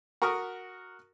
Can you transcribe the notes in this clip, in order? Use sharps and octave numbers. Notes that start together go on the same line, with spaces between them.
F#4 A#4 C#6 D#6 F6